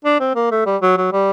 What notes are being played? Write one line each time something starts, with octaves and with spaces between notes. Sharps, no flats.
D4
C4
A#3
A3
G3
F#3
F#3
G3